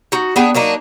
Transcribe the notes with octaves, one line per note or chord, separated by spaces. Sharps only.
D#4 F#4
B3 D4 G#4 G5
F#3 A#3 D4 D#4